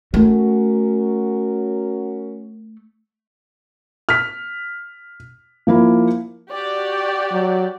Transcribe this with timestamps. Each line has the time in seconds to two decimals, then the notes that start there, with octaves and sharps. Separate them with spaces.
0.14 A3 C#4 F#4 A#4
4.09 F6 B6
5.67 F3 A#3 E4
6.50 F#4 G4 D5
7.32 F#3